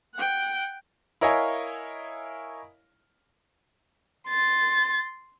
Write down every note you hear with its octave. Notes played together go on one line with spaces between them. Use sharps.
F#5 G5
E4 A#4 C#5 D#5 F5 G#5
C6 A6